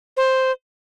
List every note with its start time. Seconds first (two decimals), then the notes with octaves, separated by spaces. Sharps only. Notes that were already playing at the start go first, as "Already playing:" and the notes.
0.17 C5